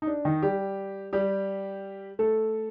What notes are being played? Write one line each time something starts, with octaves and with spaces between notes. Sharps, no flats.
D#4
D4
D#3 D#4
G3 G4
G3 G4
A3 A4